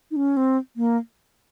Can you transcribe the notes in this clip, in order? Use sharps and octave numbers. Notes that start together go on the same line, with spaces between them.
D#4
C#4
C4
A#3